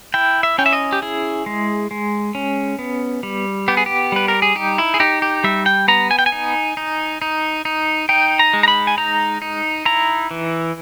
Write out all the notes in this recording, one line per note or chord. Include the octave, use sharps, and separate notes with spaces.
E4 G5
E5
C#4 G5
E5
D#5
G4
E4 G#4
G#3
G#3
C#4
B3
G3
B3 G4
G#4
G4
G3 B4
A#4
G#4
D#4 G4
E4
G#4
D#4 G4
G4
G3 E5
G5
B3 A#5
G#5
G5
G#5
D#4
D#4
D#4
D#4
D#4 G5
A#5
G#3
A#5
B5
G#5
D#4 A#5
D#4
E4 A#5
E3